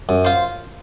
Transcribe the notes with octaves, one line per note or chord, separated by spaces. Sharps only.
F#2
F4 C5